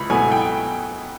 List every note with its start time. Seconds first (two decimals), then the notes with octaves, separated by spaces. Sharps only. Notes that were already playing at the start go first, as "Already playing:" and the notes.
Already playing: C#2 B5
0.10 B2 F#3 A3 G#5
0.32 G5